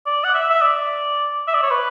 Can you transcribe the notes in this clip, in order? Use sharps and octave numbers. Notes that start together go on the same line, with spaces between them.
D5
F#5
E5
E5
D5
E5
D5
C#5
B4